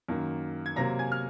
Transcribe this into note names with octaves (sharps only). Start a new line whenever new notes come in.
F#2 D#3 A#3
G#6
C3 F#3 A#3 A#5 A#6
G#5 G#6
F6